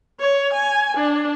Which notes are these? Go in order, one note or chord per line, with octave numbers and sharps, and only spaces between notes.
C#5
G#5
D4